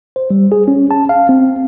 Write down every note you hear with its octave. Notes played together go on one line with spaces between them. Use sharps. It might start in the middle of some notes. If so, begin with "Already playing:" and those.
C5
G3
G#4
C#4
A5
F5
C4